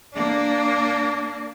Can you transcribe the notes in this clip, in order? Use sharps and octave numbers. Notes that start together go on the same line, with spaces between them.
A#3 D4